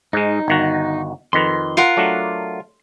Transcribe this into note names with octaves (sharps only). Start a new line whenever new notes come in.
G#2 G#3 D#4
G1 D#3 F#4
F2 D#3 B4 C6
F4 A#4 F#5
F#3 A3 D4